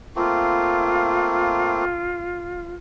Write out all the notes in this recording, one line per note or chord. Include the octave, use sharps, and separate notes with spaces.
A3 A#3 C4 F4